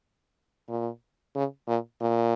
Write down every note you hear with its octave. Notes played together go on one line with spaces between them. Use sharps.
A#2
C#3
A#2
A#2